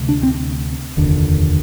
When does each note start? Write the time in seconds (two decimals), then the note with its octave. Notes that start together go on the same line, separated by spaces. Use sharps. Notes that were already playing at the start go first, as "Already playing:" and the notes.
Already playing: D2 C3
0.09 D4
0.23 C4
0.97 F1 D#2 D3